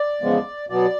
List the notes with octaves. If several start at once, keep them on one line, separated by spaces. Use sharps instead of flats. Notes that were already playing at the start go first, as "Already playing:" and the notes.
Already playing: D5
E2 C#3 F3 G#3 B3
B2 F#3 B3 D5